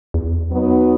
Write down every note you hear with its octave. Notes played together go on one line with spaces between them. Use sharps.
E2
F#3 B3 D#4